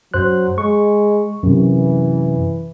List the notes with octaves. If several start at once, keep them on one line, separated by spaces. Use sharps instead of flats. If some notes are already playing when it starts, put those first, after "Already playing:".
F#2 F#3 C5 F#6
G#3 C#6
F#2 C3 E3